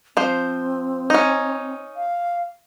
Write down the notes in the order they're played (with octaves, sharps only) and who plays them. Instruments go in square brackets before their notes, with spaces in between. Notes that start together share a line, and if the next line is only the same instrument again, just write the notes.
[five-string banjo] F3 C5 [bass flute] C4
[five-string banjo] C#4 D#4
[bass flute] F5